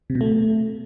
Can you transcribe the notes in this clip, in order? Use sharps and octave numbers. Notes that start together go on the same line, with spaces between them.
C3
B2
A3